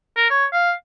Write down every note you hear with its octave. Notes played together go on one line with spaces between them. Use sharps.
A#4
C#5
F5